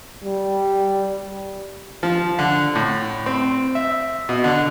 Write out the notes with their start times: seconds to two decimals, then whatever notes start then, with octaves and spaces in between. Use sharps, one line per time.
0.24 G3
2.03 F3
2.39 D3
2.75 A2
3.26 C4
3.75 E5
4.29 B2
4.44 D3